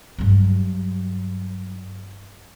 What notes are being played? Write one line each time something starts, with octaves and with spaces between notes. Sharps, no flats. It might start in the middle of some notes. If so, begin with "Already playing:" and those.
G2 F#3